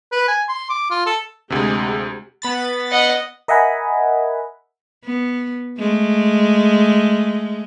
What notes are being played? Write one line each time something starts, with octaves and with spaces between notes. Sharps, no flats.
B4
G#5
C6
D6
F4
A4
D2 C3 G#3 G4 G#4
B3 B5 A6
D#5 F#5
A#4 D#5 E5 F#5 G#5 B5
B3
G#3 A3